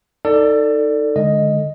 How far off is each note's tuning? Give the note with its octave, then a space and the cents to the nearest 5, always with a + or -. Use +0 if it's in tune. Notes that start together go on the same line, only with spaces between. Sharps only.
D#4 +0 A4 +25 D5 +0
D3 +0 G#3 +0 D#5 +0